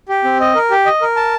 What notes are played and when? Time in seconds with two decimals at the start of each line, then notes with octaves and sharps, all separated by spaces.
0.09 G4
0.24 C4
0.40 D#5
0.55 A#4
0.71 G4
0.86 D#5
1.02 A#4
1.16 A5